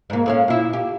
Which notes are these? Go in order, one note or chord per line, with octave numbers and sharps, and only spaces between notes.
G#2 A#3
A2 C#4 F5
A#2 E4
G4